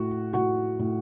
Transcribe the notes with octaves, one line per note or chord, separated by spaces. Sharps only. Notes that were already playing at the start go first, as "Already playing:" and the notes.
Already playing: A2 F#4
A2 F#4 F#5
A2